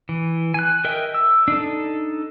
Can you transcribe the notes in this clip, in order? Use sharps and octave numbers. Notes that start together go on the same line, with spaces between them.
E3
G#5 F#6
A#4 D#5 E5 G5
E6
D4 D#4 A4